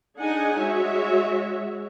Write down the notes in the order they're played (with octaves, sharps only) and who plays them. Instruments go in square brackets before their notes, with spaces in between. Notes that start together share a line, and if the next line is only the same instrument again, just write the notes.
[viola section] D4 D#4 G#4 F#5 G#5
G#3 F#4 C#5 E5